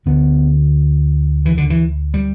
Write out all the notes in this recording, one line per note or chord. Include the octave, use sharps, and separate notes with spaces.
D2 D3 B3
E3
D3
E3
G3